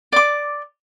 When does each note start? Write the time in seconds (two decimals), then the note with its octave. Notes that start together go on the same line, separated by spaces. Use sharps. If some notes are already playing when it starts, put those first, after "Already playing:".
0.12 D5 D6